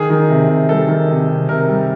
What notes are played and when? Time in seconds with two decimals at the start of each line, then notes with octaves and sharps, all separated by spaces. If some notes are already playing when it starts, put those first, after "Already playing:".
Already playing: D#3 G#4
0.10 D#3
0.30 C3
0.49 C3
0.69 G3 A4
0.89 D#3
1.10 C3
1.29 C3
1.49 C3 A#4
1.68 G3